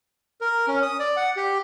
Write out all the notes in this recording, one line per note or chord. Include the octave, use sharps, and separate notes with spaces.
A#4
C#4
D#6
D5
F#5
G4